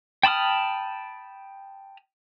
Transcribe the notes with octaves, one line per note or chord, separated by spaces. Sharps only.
G5 A5 B5 D#6 F6